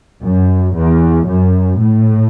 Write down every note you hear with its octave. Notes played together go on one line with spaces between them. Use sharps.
F#2
E2
F#2
A2